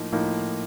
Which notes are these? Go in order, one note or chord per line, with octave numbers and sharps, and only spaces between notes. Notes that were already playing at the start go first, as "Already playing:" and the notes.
Already playing: A2 F3 A#3 D#4
A2 F3 A#3 D#4